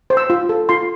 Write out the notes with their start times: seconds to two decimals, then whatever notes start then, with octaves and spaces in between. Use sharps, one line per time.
0.10 C5
0.17 E6
0.30 F4
0.49 A4
0.69 F4 C6